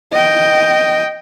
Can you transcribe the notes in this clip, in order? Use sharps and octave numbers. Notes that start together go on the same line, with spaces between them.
D#5 G5